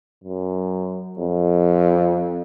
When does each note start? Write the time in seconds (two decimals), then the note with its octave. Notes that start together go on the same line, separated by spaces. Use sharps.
0.24 F#2
1.19 F2